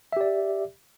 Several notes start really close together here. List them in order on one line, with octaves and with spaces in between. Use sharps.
E5 G4 D5